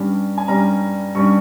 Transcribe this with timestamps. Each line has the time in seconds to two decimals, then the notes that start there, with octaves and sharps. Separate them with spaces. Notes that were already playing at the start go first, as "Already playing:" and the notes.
Already playing: G2 G3 C#4
0.38 G#5
0.48 G2 G3 C#4 A#5
1.15 G2 G3 C#4 C#6